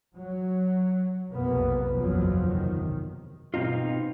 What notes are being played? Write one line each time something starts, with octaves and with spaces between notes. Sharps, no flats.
F#3
B1 F2 C3 A#3 B3
F#1 B1 E2 B2 F3 F#3
C3 D#3
B2 D#3 C4 D#4 F4